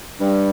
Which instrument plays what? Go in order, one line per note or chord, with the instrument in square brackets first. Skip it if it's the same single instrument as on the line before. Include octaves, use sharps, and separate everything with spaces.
[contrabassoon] G2 [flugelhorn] G3